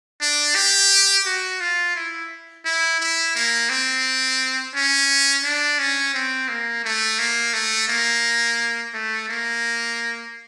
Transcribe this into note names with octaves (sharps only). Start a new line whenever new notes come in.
D4
G4
F#4
F4
E4
E4
E4
A#3
C4
C#4
D4
C#4
C4
A#3
A3
A#3
A3
A#3
A3
A#3